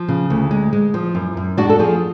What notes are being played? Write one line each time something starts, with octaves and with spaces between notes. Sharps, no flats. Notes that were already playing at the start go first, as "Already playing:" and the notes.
Already playing: F3
C#3
D2
G#3
G#3
F3
F#2
F#2
G#3 D4 F#4
A4
F3 F4 G#4